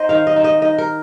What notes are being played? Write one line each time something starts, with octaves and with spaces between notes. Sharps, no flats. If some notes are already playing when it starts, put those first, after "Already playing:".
Already playing: C4 D#4 C5 D#5
D#3 F5
D#5
C4 D#4
D#5
D#3 D#5
A#4